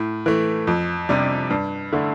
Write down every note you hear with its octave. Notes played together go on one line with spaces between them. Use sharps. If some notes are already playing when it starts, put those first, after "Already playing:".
Already playing: A2
E3 A3
F2
C3 G3 D4
G2
D3 A3 E4